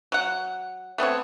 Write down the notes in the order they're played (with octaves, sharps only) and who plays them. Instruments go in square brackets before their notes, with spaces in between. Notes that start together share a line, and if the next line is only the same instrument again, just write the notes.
[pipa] F#3 F#5
A3 B3 C4 C#5